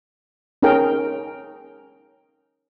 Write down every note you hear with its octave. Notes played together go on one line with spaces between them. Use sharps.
C#4 D#4 G#4 A#4 G5